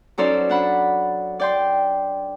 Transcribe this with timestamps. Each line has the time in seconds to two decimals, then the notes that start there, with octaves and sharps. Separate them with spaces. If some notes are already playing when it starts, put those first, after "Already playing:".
0.18 F#3 C#4 D#4 A4 C5 D5
0.49 D4 F#5 B5
1.40 D5 G5 C6